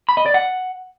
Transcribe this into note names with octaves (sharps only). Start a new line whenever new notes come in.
B5
D#5
D5
F#5